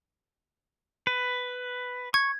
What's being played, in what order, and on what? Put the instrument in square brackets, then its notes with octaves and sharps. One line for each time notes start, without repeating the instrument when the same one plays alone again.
[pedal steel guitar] B4
[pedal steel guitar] C#6 [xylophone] G#6